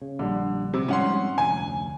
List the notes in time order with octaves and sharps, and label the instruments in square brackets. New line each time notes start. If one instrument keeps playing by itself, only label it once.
[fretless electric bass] C#3
[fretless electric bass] A#1 G3 [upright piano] D3
[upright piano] C3
[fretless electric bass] G#2 F3 G3 [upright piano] C#4 F#5 C6
[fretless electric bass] F1 D2 [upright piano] G#5